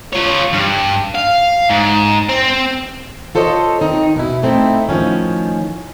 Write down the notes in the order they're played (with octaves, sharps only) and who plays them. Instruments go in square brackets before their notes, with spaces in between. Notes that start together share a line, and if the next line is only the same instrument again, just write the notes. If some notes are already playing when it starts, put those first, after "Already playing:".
[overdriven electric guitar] F4 C#5
G2
F5
G#2
C4
[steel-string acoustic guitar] F4 A4 C5 C#5 D#5
D#3 C4 D#4
B2 E4
A3 C4 D#4 E4
A2 D#3 F3 C#4